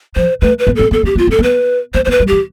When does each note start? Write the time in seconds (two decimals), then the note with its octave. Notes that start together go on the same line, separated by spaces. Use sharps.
0.16 F3 C5
0.41 A3 B4
0.59 B4
0.67 B3
0.76 C4 A4
0.91 B3 A4
1.03 C4 G4
1.16 B3 F4
1.27 C4 A4
1.39 B3 B4
1.94 B3 C5
2.05 B3 C5
2.11 B4
2.20 G3
2.28 E3 G4